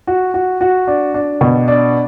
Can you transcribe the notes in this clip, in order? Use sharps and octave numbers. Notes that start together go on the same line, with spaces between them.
F#4
F#4
F#4
D4
D4
B2
D4